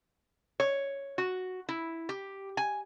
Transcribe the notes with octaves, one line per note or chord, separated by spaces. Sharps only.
C#5
F#4
E4
G4
G#5